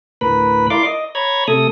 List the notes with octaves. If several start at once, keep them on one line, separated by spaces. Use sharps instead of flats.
D2 A2 A#4 B4 B5
E4 A#4 D5 F5 C6 D6
D#5
C#5 A#5 B5 G#6
C3 A3 A4 D#6